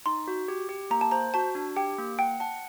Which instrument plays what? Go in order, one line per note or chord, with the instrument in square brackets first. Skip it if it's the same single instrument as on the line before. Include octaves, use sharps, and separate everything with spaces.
[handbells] D#4 [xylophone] C6
[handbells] F#4
G4
G4
[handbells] A#3 [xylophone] A#5
[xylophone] A5
[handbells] C5 [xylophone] A#5
[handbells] F#4 [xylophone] A5
[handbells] D4
[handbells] G4 [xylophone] G5
[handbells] A#3
[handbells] F#5 [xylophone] G5
[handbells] F#5 [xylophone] A5